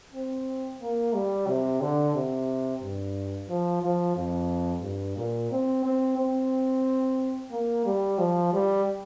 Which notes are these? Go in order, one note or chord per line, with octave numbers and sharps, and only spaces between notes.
C4
A#3
G3
C3
D3
C3
G2
F3
F3
F2
G2
A#2
C4
C4
C4
A#3
G3
F3
G3